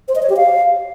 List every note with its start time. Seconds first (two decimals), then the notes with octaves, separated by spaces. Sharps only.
0.08 C5
0.15 D#5
0.23 C#5
0.30 G4
0.37 F5